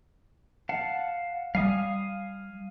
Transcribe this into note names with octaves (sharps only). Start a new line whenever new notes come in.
F5 F#5 A5
G3 F5 G#5 D#6